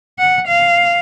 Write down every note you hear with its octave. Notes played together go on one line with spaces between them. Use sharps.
F#5
F5